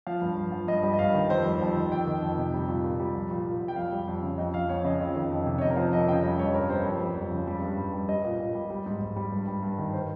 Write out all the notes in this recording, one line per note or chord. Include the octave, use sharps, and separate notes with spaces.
F3 F5
G2
G2
F3
G2 D#5
G3
D#5
G2 F5
D#3
F2 C5
G3
F2
D#3
F2 G5
D#3
F2
C3
G3
A#2
A#2
G3
F3
A#2
A#2
F3
G5
F2 F5
G3
F2
C#3
F2 D#5
F3 F5
F2 C#5
C#3 D#5
F2
D#3
F2
C3
C#5
F2 D#5
A#4
F3 C5
F2 D#5
C#3 G5
G3 D#5
G2 C#5
G2 A#4
G3 C5
F2
G3
F2
C#3
G3
G2
G2
G3
G3 D#5
A#2
A#2
G3
G3
G#2
G#2
G3
G2
G3
G2
D#3
C5